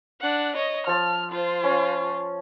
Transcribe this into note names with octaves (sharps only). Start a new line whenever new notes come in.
D4 F#5
C#5 D#5
F3 A5 F6
F4 C5
C#4